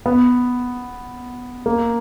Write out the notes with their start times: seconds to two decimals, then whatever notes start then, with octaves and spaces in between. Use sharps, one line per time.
0.06 B3
1.66 A#3